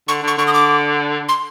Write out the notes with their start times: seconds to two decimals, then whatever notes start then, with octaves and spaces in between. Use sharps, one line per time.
0.08 D3 C#6
0.23 D3 C#6
0.38 D3 C#6
0.47 D#6
0.54 D6
1.29 C6